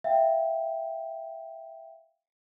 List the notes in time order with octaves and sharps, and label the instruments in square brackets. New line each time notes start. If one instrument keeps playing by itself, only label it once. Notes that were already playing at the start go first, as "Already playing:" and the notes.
[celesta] E5 F5 G5